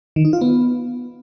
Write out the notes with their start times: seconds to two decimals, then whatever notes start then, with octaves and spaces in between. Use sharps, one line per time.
0.16 D#3
0.25 D#4
0.33 F4
0.41 B3